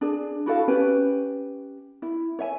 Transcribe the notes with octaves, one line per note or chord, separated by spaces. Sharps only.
D4 G#4
E4 F#4 A4 F5
C#4 G4 B4
E4
C#5 E5 G#5